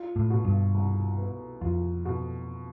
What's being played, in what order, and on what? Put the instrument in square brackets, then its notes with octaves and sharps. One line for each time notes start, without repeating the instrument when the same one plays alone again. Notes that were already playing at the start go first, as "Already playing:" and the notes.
Already playing: [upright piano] F4
[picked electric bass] A2
[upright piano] B2
[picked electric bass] G2
[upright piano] C2
B3
[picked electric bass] F2 [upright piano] F4
[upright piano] B2